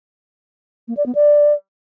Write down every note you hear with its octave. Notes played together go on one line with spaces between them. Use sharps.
A#3
D5
B3
D5